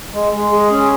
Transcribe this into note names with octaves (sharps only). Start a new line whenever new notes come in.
G#3
G#3
G#4
C#4